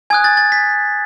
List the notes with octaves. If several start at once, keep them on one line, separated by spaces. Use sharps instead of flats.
G#5 D#6 F#6 G#6
A6
A6
B6